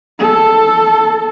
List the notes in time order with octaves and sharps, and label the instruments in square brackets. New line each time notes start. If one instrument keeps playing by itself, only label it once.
[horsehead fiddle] A4